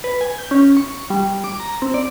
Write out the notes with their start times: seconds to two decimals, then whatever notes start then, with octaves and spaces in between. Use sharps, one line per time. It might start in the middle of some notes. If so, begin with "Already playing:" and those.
0.04 B4
0.21 G#5
0.38 G6
0.51 C#4
0.77 C#6
1.10 G3
1.44 D6
1.60 A#5
1.82 C4
1.94 D5